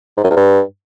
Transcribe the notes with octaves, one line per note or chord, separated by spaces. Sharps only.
G#2
F#2
E2
G2